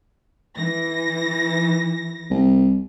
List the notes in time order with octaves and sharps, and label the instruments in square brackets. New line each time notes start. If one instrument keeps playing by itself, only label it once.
[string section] E3 A#6
[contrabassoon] C2